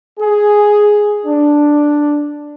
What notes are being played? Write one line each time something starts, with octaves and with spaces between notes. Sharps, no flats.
G#4
D4